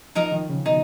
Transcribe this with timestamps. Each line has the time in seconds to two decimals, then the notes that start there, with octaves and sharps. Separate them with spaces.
0.15 F3 D#4 A#4 D#5
0.32 D#3
0.49 C#3
0.66 B2 D#4